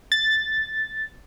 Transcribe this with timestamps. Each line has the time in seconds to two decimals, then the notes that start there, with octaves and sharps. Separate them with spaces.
0.12 A6